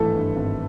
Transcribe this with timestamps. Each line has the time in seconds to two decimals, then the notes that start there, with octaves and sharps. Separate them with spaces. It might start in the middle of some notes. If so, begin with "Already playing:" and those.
Already playing: G#1 G2 E3 A3 A4 B4
0.15 G2
0.36 G#1